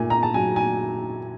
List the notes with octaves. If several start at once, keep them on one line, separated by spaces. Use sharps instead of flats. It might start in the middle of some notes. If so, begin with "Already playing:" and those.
Already playing: A#2 A3 G#5
A#5
A5
F#3 G#5
G#5